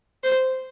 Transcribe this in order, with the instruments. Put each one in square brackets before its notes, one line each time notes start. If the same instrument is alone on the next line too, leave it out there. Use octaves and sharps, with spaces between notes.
[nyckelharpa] C5